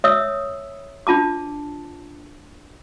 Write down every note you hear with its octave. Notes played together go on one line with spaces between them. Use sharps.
C#5 E5 D#6 E6
D4 F4 A5 D6